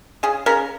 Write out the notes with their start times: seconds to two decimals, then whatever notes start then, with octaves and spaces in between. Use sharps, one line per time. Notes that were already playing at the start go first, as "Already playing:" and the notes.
0.23 C#3 G#4
0.46 C#3 A#4